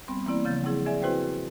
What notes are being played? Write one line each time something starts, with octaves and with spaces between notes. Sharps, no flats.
G3 B3 C4
E3 A#3 C4 E4 D5
C#3 F3 G6 A6
F#3 C4 E4 G#4
G#4 D5 E5 G#5
C4 E4 F#4 B4 C5 G5